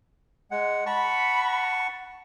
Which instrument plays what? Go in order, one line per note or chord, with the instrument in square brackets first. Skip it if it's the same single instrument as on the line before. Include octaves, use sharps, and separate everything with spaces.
[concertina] G#3 F#5
[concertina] F#5 A5 C#6 [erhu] B5